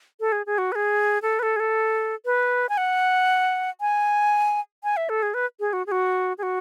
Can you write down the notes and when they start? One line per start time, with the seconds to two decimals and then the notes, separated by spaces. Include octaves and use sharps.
0.20 A4
0.32 G#4
0.46 G#4
0.58 F#4
0.72 B4
0.75 G#4
1.22 A4
1.39 B4
1.43 A4
1.56 G#4
1.60 A4
2.25 B4
2.69 G#5
2.78 F#5
3.81 G#5
4.84 G#5
4.97 E5
5.09 A4
5.23 G#4
5.34 B4
5.60 G#4
5.73 F#4
5.87 G#4
5.92 F#4
6.38 G#4
6.43 F#4